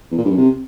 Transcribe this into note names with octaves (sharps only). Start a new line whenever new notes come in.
E2
A#2
G2
F#2
C3